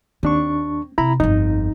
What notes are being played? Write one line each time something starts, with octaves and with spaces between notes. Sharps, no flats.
D#2 C4 D4 C#6
C3 E4 A#5 B5
G1 F2 D#4